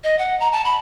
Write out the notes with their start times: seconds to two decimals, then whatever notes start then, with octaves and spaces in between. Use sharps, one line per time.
0.04 D#5
0.18 F#5
0.40 A#5
0.53 A5
0.65 B5